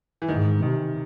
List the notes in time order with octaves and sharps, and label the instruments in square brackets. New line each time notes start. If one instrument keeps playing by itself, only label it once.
[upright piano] E3
[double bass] G#2 [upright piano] D#3
[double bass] C3 [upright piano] D#3